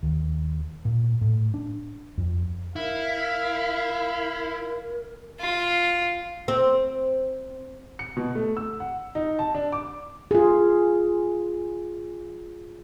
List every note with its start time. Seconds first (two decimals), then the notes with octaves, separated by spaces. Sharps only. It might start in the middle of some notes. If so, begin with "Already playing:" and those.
0.03 D#2
0.85 A#2
1.21 A2
1.54 D4
2.18 F2
2.76 E4 A#4 F5
5.40 F4
6.48 C4
7.99 C#7
8.17 B2
8.35 A3
8.57 E6
8.80 F#5
9.15 D#4
9.39 A5
9.55 D4
9.72 D6
10.31 F4 G#4